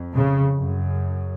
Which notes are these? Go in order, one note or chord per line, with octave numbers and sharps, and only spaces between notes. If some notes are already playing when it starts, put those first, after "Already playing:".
Already playing: F2
C#3
F#2 C#3